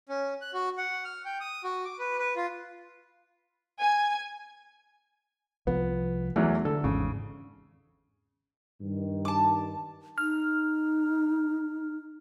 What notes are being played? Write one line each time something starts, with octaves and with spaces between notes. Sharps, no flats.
C#4
F#6
F#4
F#5
F6
G5
D#6
F#4
D6
B4
B4
F4
G#5
C2 F3 B3
E2 E3 F#3 A3
D3 A4
G#1 E2 G#2 C#3
G2 D#3
A5 D6
D#4 F6